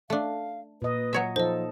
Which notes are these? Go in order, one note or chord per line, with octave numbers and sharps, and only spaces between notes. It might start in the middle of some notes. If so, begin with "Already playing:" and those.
A3 D4 F5
A#2 B4 D#5
F#3 C#5 E5
F3 D#4 A4 C5 D#5